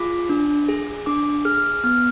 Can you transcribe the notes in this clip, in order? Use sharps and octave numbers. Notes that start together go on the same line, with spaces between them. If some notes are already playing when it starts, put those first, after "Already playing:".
Already playing: F4 G#4 D6
D4
G#4
D4 D6
G#4 F6
B3 F6